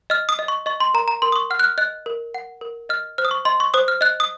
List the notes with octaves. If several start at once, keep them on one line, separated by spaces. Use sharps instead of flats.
D#5 F6
D#6
D#5
C#6
D#5 C#6
C6
A#4 A#5
A#5
A#4 C6
D#6
C#6
F#5 F6
F#6
F6
D#5 F#6
A#4
F#5
A#4
D#5 F6
C5 F6
D#6
C#6
D#5 C6
C#6
C5 D#6
F6
D#5 F#6
D#6